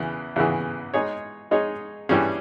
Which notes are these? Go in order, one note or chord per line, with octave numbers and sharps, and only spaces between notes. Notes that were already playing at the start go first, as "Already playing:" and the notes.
Already playing: E2 C#3 E3
E2 C#3 E3
G#3 D#4 G#4 C#5
G#3 D#4 G#4 C#5
G2 E3 G3 C#4 G#4